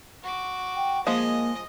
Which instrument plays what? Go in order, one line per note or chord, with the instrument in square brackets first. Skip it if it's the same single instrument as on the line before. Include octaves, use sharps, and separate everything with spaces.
[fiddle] F#4 D6
[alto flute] G5
[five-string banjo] F3 G#3 G#4 [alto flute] A#3 [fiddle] D#5